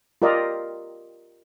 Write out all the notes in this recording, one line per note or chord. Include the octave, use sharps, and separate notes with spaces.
F4 G4 A#4 D5 D#5